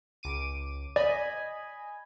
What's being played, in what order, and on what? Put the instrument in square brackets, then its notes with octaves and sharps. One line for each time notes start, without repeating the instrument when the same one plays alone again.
[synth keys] C#2 D6 D#7
[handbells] D5 [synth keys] D#5 G#5 B5